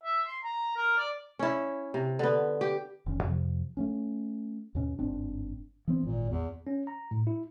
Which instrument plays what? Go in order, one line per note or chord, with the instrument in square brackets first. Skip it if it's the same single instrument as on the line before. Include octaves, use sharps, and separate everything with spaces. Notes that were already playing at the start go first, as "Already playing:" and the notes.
[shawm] E5
C6
A#5
A#4
D5
[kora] C#4 E4
C3
D3 B3
G4
[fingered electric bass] F1 D#3 C#4
F2 C3 F3
A3 A#3 C#4
D#2 G#2 B2 C#4
G1 G#2 C4 D4
[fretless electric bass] E3 B3 C4
[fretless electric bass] G#1 [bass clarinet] A#2
[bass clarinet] E2
[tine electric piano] C#4
A#5
A2
E4